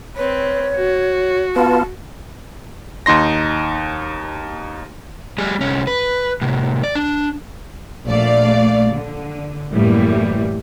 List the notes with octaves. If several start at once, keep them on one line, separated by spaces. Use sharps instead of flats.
C4 B4 C#5
F#4
B3 F4 A5
D#2 D#4 C6 A#6
G3 G#4
C2 C#4
B4
A2 C3
D5
D4
A#1 A3 D5 F5
D3
F#2 A2 E3 G3 A#3